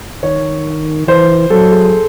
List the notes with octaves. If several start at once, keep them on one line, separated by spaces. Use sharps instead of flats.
D#3 C#5
E3 C5
F#3 A4
G#4